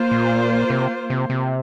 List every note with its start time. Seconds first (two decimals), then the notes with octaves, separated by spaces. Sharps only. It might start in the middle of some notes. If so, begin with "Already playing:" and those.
Already playing: A#3 F4 C5
0.11 A#2
0.70 C3
1.10 C3
1.30 C3